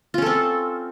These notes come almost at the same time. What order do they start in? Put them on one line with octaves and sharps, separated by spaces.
F4 C#4 A4 C4